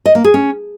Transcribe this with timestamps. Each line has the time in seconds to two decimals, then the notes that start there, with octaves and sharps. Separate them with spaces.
0.06 D#5
0.15 A#3
0.24 G#4
0.34 C#4